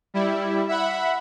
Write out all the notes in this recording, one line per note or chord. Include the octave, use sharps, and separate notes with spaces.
G3 E4
E5 F#5 B5